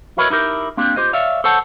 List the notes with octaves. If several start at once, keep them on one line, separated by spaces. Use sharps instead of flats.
E4 F#4 A#4 B4 C#5 D#5
D#4 E4 G4 A#4
A#3 C4 D4 G4
F4 G4 C5 D#5
C#5 D5 E5 F5
A4 C5 C#5 F#5 A5